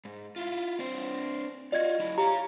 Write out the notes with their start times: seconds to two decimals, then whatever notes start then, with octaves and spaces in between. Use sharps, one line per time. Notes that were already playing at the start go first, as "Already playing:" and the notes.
0.05 G#2
0.36 E4 F4
0.79 C4 D4 C5
1.72 F4 F#4 D5 D#5 G#6
1.99 F#3 E4
2.18 G4 C#5 F5 A#5